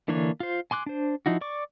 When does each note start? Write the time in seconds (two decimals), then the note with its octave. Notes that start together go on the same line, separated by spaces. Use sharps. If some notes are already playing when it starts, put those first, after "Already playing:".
0.08 D3 E3 A#3 D4 C#5
0.40 F4 C5
0.71 G#5 C6 D6 F#6
0.86 D4 C5
1.26 F3 D#4 E4 F#4
1.41 D5 C#6 D6